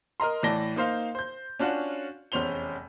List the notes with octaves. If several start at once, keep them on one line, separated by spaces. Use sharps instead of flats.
A#4 D#5 A#5 C6
A2 E3 D5 A5 A#6 G7
A#3 D#4 C5 F5
C5 G6
C#4 D4 F4 F#4 C#5
F1 E2 C#4 C5 F7 G7